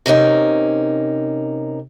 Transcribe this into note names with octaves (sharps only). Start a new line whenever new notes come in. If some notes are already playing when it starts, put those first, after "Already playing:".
C3 A#3 C#4 D#4